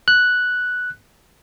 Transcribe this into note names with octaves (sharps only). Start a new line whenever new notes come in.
F#6